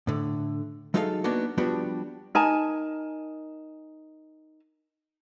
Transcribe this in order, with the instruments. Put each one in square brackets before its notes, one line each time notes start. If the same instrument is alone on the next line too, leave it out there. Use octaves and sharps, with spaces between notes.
[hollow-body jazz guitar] A2 D3
F#3 G#3 D#4 F4 A4 F5
A#3 B3 D4 D#4 F#4
F3 G3 B3 D4 F#4 G4
[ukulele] D#4 A#4 G#5 A5